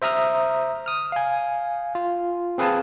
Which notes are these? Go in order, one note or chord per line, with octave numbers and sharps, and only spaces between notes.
C5 E5 A#5 D#6 F6
D#6 F6
F5 G#5
F4
C4 G#4 B4 F5 G#5 A5